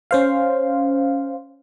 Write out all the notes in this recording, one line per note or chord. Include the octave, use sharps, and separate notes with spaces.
C#4 C5 F5